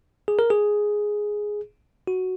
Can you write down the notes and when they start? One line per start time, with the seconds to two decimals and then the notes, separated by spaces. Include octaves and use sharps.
0.28 G#4
0.39 A#4
0.50 G#4
2.07 F#4